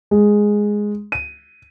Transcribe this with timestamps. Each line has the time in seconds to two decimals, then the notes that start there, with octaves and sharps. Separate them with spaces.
0.11 G#3
1.12 D#7